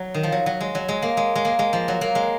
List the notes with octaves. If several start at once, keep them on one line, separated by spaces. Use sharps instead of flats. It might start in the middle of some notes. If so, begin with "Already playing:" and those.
Already playing: F#3
D#3
F3
F#3
F#3
G#3
F#3
G#3
A#3
G#3
G#3
A#3
G#3
F3
F#3
A#3
G#3